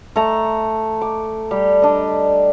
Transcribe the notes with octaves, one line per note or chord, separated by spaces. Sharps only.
A3 A#5
D6
G3 G4
D4 D#5